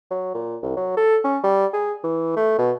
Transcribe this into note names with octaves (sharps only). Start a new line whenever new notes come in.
F#3
A#2
C2
F#3
A4
C#4
G3
G#4
E3
A3
B2